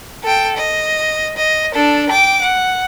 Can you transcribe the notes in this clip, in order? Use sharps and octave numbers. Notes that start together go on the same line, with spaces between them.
A4 G5
D#5
D#5
D4 A4
G5 D6
F#5